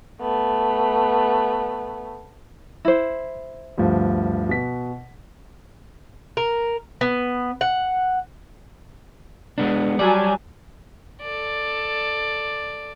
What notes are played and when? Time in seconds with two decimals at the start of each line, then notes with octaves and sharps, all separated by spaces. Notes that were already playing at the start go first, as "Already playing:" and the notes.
0.21 A3 B3
2.85 E4 C5
3.78 D2 G2 F3
4.49 B2 B6
6.37 A#4
7.01 B3
7.61 F#5
9.58 G#3 B3 D4
9.99 F#3 G3 D5 G#5 A5
11.21 A4 D5